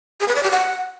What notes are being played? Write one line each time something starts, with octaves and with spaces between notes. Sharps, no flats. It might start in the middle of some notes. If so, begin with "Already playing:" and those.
G#4
B4
D5
G4
F#5